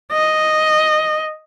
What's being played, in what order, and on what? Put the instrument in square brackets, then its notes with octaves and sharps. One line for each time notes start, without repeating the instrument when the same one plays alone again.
[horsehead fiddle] D#5